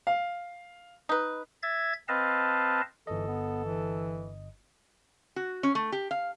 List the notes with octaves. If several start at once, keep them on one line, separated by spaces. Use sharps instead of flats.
F5
D#4 B4
E5 G#6 A6
C4 B4 D#5 F5 A5
G1 E3 A4 D#5
B3
E3
F#4
C#4
A3
G4
F5